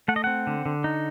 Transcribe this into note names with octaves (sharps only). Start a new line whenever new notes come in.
A3 F#5
D#5
C4 F#5
D3
D3
D#4